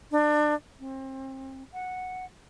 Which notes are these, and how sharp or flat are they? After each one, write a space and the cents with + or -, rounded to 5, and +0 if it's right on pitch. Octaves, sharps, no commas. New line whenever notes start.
D4 +30
C4 +30
F#5 -5